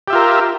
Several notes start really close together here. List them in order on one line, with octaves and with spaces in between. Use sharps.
G4 E5 F4 A#4